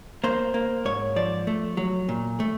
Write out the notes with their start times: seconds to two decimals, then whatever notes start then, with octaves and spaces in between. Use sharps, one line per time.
0.24 A#3 C5
0.54 A#3
0.85 G#2 C#5
1.16 F3 D5
1.47 A3
1.77 F#3
2.09 A#2
2.40 A3